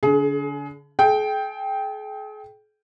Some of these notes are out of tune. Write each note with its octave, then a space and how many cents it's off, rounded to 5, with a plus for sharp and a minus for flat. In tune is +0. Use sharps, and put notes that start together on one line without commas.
D3 -35 G#4 +25
G#4 +40 G5 +0